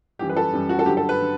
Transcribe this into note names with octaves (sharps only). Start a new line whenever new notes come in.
F#2 E3 G3 G4
B4
A4
F#2 E3 G3
F#4
A4
G2 D3 F#3 G4
A4
B4
D3